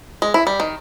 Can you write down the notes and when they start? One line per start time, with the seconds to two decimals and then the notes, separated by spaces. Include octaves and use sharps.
0.22 G#3
0.34 E4
0.47 G3
0.60 D#3